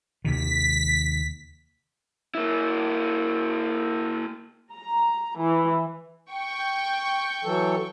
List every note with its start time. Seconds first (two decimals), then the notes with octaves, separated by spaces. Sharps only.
0.25 D#2 C3 D#3 B6
2.35 A#3 E4
4.73 A#5
5.40 E3
6.31 G5 C#6
7.44 E3 F#3 A4